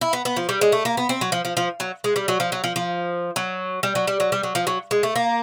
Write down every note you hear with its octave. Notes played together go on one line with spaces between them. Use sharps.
E4
B3
B3
F3
G3
G#3
A3
A#3
B3
C4
F#3
F3
F3
F3
F#3
G#3
G3
F#3
F3
F#3
F3
F3
F#3
G3
F#3
G3
F#3
G3
F#3
F3
F#3
G#3
A3
A#3